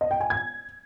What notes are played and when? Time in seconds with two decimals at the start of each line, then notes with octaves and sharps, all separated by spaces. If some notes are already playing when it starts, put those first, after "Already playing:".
0.01 D#5
0.11 G5
0.20 G#5
0.30 G#6